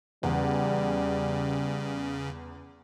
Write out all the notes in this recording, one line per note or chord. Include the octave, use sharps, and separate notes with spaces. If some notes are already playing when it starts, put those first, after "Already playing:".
E2 C#3 G3